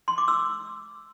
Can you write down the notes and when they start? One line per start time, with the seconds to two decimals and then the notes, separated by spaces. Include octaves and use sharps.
0.08 C6
0.18 D6
0.28 E6